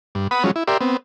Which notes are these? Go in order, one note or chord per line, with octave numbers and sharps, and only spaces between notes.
G2
B4 F#5 B5 D#6
F3 F#3 G#3 C#4
E4
G4 A#4 D5 E5 C6
B3 C4